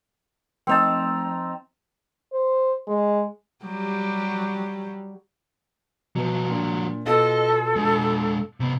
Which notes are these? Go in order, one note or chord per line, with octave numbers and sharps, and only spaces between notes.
F3 A3 C4 D#4 G5 A5 E6 F7
C5
G#3
F#3 G3 G4
B2 F3 F#3
A#2 D4
B2 F4 A4 D#5 F5
G#3 D4
C3 B3